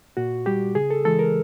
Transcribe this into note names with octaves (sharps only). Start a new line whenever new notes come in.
A#2 F#4
G3 G4
C#3 G#4
A4
E3 G#3 A4
A#4